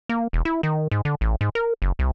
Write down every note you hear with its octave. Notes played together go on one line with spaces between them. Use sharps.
A#3
E1
E4
D#3
G#2
D3
A1
G#2
A#4
F#1
C2